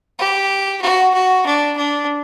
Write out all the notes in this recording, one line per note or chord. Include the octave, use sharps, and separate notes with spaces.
G4
F#4
F#4
D4
D4